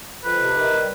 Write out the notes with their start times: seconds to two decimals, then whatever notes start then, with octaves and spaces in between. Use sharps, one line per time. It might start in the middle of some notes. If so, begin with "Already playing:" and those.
0.25 F2 B4
0.40 C3
0.56 D#3
0.71 G3